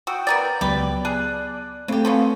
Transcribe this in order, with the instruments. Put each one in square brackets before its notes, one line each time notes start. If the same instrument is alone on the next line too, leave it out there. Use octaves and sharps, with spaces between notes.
[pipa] F#4 [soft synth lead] G5 [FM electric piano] D#6 E6
[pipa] B3 A#4 D5
[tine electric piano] C#2 F#3 [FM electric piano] B3 [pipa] G4 B4 [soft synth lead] D5
[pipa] G#4 [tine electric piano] A5 F#6
[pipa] C#3 G4 [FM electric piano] A3 A4 [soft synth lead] C4
[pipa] F3 B3 C#4